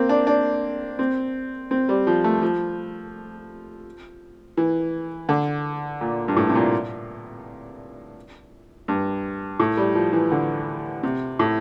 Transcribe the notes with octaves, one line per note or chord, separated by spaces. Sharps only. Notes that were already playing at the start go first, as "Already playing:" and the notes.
Already playing: A#3 C4
D4
D4
C4
C4
G3
F3
A3
F3
E3
D3
A#2
G2
A2
C3
A#2
G2
A2
G3
F3
E3
D3
C3
A2